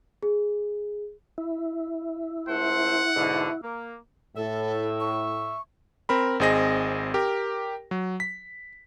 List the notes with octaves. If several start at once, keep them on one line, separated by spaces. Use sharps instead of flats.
G#4
E4
C#2 A3 C5 F#5
G#2 B2 D3
A#3
A2 A4 E5
C#6
C4 A#4 B5
G#1 C4 G#4 D#5 A#6
G4 A#4
F#3
B6